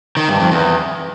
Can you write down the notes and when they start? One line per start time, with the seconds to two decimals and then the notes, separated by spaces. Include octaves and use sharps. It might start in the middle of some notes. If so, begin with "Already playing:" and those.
0.17 D#3
0.28 G2
0.40 F2
0.51 E2